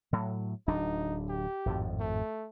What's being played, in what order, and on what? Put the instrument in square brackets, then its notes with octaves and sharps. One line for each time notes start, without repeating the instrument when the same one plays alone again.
[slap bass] A2 F#3
[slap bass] D1 F#3 D4 [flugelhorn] D#4
[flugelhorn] G4
[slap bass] G#1 F2 A2
[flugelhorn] A3